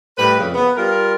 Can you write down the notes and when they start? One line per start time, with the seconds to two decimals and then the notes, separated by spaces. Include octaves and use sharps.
0.17 A2 G3 B4
0.38 F2 C#3
0.55 B3
0.76 G3 F4 A#4